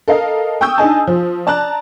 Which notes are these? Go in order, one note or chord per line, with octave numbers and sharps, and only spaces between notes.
A4 A#4 D#5 F5
G5 C#6 D#6 E6 G6
D4 D#4 G#4 D#5 G#5 A5
F3
D5 A5 A#5 F#6